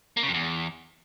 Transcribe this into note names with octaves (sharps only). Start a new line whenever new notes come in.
A#3
C#3
F2
E2